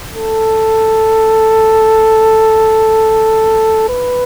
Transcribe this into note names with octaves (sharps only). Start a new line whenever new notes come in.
A4
B4